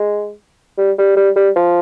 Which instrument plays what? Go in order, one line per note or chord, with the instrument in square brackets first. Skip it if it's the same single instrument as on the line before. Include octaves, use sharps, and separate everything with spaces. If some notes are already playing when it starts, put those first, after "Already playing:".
Already playing: [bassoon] G#3
G3
G3
G3
G3
F3